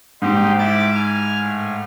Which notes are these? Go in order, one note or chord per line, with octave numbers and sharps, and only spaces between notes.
G#2 D#4 G4 C5
E4 D6 A6
G#5 F6
A2